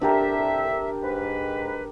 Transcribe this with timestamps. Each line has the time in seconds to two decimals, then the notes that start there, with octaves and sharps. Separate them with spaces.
0.01 C2 D3 D4 G4 A#4 E5
1.03 G#2 B4